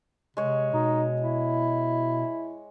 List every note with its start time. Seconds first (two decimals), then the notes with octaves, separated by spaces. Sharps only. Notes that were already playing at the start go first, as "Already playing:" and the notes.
0.37 C3 G#3 C#5
0.73 B2 D#4
1.21 E4